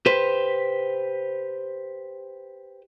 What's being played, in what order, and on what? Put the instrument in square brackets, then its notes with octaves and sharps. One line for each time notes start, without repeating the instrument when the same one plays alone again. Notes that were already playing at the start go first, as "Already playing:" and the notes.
[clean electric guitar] G4 B4 C5